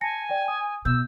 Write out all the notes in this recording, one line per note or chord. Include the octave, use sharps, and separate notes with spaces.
G#5 A5 A#6 C#7
D5 G5
D#6
B2 E6 G6